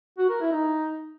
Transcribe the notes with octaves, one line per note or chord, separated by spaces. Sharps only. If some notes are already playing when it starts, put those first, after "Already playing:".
F#4
A#4
E4
D#4